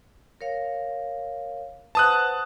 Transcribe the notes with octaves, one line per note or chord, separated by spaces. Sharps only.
A#4 C#5 F5
B4 C5 F#5 A5 D#6 F#6